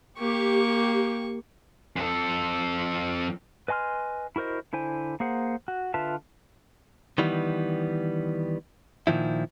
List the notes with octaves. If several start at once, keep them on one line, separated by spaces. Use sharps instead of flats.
A#3 G4 C#6
F2 A4
B4 D#5 G#5 C6 F6
E4 F#4 A#4 C5 D#5
D3 E4 C5 G#5
A#3 G#4 C5 F#5
F#4
D3 F4 B4 E5 A5
D#3 E3 G3 B3
A#2 D#3 F3 E4